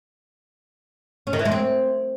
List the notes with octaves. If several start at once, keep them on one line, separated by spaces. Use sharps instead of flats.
C#4
D#3
E3
G#3
C4